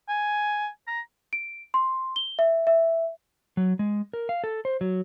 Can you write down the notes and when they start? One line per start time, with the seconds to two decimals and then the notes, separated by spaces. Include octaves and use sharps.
0.09 G#5
0.87 A#5
1.33 D7
1.74 C6
2.16 G7
2.39 E5
2.67 E5
3.57 F#3
3.79 G#3
4.13 A#4
4.29 F5
4.44 A4
4.65 C5
4.81 F#3